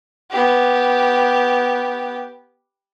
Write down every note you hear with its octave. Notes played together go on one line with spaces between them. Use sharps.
B3 G4